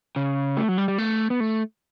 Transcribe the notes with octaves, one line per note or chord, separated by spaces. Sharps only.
C#3
A3
F#3
G3
G3
A3
B3
A3